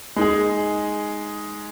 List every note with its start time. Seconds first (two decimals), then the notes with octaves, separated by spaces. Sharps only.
0.16 G#3 D#4 G#4